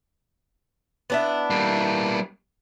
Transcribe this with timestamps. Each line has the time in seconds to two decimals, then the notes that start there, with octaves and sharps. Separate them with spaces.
1.10 B3 D4 E4
1.50 G3 A#3